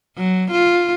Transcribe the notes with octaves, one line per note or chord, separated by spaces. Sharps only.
F#3
F4